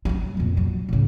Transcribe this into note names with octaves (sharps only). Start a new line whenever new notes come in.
F#3 G3
F2 A#2
F#3
A2 C#3